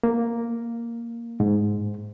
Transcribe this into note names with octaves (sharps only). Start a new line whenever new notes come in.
A#3
G#2